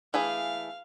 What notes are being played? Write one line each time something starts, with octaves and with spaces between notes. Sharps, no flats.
E3 A3 G#4 F5